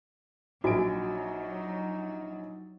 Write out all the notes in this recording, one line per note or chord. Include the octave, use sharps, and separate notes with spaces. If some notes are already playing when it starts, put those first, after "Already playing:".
A#1 F#3 D#4 F#4 G#5 D7